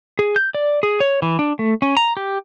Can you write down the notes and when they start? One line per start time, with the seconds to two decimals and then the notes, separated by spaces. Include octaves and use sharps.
0.19 G#4
0.36 G6
0.55 D5
0.83 G#4
1.00 C#5
1.22 E3
1.39 D4
1.59 A3
1.82 C#4
1.97 A#5
2.17 G4